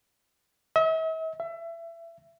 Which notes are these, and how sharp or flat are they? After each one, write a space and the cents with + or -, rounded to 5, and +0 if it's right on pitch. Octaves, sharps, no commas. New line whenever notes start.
E5 -45
E5 +25